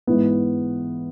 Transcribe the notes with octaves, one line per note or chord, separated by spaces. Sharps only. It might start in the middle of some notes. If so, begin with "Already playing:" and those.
G#2 E3 B3